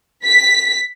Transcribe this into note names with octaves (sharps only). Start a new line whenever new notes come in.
B6